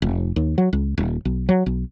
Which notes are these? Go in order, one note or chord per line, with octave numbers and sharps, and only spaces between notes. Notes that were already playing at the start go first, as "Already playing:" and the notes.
F1
D#2
F#3
C#2
D#1
B1
F#3
B1